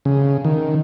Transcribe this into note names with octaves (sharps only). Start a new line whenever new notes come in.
C#3
D#3